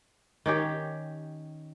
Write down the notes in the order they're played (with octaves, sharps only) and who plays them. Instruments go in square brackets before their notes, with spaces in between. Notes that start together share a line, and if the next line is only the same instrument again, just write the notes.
[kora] D#3 C#4 G4